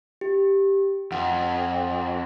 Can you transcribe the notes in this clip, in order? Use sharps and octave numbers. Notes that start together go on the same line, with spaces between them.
G4
F2 F#5